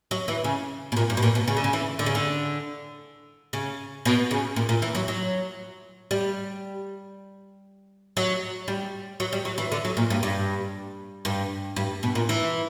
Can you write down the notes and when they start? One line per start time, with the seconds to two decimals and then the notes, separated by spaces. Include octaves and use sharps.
0.11 F#3
0.28 E3
0.44 C#3
0.92 B2
0.97 A#2
1.10 G2
1.17 B2
1.23 A#2
1.35 B2
1.48 C#3
1.57 D3
1.64 C#3
1.73 E3
1.99 D3
2.06 C#3
2.15 D3
3.53 C#3
4.05 B2
4.31 C#3
4.56 A#2
4.69 A#2
4.82 E3
4.95 F#3
5.08 F#3
6.11 G3
8.17 F#3
8.68 G3
9.20 F#3
9.33 G3
9.45 F#3
9.58 E3
9.72 D3
9.85 F#3
9.97 A#2
10.10 G2
10.23 G2
11.25 G2
11.76 G2
12.03 B2
12.15 A#2
12.29 E3